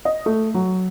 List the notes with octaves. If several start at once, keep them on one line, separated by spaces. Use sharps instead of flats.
D#5
A3
F#3